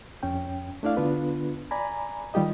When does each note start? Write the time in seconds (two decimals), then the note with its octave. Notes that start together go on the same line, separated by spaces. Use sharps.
0.23 F2 C#4 G5
0.83 A3 D4 E4 D5 F5
0.97 D3 B3 D4 F4 B4
1.71 D5 G#5 A#5 B5
2.34 D#3 G3 F4 G4 D#5